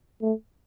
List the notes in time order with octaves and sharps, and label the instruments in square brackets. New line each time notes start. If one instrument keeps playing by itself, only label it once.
[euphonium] A3